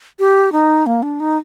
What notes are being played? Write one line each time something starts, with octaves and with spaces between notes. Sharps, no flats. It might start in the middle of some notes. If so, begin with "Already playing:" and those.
G4
D#4
A#3
D4
D#4